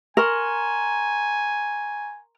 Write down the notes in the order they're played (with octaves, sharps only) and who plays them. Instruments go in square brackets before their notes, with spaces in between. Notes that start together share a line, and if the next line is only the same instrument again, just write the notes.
[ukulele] A#4 [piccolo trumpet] G#5 [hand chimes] A#5 C6 C#6